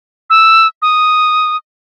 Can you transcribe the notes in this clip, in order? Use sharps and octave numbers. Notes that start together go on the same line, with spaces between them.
E6
D#6